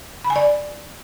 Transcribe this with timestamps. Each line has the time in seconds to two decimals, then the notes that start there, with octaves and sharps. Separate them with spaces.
0.24 B5
0.30 G#5
0.36 D5